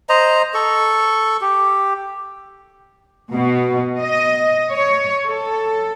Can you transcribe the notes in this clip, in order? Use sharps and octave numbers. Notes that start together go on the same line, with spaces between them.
C5 D#5 A#5
A4 C#6
G4
B2
D#5
C#5
A4